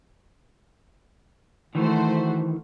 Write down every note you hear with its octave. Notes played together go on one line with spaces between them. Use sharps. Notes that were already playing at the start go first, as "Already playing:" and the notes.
D#3 E3 A3 F#4 C5